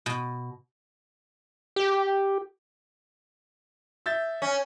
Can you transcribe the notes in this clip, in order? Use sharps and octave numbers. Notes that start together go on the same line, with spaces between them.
B2
G4
E5 G6 A6
C#4